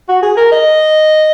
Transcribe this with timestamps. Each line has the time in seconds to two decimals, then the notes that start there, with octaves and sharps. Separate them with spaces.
0.09 F#4
0.23 G#4
0.37 A#4
0.52 D#5